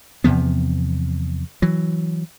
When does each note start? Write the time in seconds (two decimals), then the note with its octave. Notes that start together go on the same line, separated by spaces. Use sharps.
0.24 E2 C3 F3 B3
1.62 E3 F#3